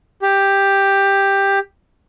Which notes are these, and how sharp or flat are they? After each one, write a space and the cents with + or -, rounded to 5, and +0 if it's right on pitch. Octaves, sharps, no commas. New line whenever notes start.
G4 +10